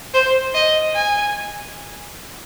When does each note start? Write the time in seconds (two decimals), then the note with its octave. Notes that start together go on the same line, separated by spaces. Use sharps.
0.14 C5
0.54 D#5
0.95 G#5